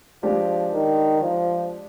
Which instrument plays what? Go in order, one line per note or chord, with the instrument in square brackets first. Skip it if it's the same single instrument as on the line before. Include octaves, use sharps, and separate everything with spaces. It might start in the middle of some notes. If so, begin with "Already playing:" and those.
[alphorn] F3 [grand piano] G#3 D4 G4
[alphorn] D#3
F3